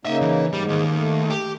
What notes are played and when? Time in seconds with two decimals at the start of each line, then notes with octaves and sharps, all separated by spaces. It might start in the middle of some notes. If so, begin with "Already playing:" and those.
0.05 C#3 A#3 D#4 D#5 E5
0.21 E3
0.53 G#2 G3
0.69 D#2 D#3
0.94 A3
1.30 G4